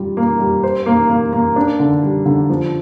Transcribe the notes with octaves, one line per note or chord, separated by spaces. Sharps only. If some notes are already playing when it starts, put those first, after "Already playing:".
Already playing: G3 F4
A#3
G3
C5
A#3
A#3
A#3
D4
D3
G3
D3
F3